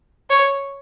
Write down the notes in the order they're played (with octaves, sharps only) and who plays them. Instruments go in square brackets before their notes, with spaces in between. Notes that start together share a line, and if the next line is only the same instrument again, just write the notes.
[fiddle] C#5